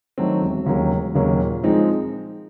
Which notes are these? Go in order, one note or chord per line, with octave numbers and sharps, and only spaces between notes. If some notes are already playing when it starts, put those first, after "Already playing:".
D#3 F#3 A3 C4
E1
D#2 C#3 F#3 A#3
E1
D#2 C#3 F#3 A#3
A#2
F3 G#3 C4 D#4